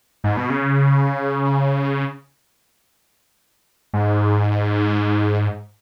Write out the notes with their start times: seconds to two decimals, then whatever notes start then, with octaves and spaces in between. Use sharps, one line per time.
0.24 G#2
0.37 B2
0.50 C#3
3.94 G#2